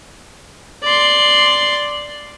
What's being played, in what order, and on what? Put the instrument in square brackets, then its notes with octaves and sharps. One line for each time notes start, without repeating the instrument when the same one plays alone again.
[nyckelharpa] D5 C6